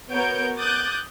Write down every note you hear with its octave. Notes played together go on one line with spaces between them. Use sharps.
B3 F#4 A#4 C#5 G6 D7
D6 D#6 F#6 G6 A6